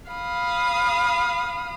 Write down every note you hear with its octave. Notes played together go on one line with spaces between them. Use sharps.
F5 B5 D#6